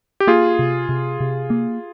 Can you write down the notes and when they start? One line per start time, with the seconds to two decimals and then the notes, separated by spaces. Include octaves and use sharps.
0.20 G4
0.27 A#3 F4 G#4
0.59 C3
0.89 C3
1.20 C3
1.50 A#3